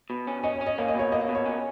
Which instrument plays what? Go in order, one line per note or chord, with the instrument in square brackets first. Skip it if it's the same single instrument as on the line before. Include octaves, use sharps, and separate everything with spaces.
[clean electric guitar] B2
C#4
[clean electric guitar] C#4 [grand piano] D#5
[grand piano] C#5
[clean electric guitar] C#4
[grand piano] D#5
[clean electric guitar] A#3 [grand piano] C#5
[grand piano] D#5
[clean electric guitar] B2 [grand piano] C#5
[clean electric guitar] A#3 [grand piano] D#5
[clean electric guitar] B2
[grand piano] C#5
[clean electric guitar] C#4